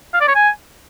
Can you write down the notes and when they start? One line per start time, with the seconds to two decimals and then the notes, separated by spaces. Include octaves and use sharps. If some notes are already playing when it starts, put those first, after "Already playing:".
0.14 F5
0.21 D5
0.28 C#5
0.35 G#5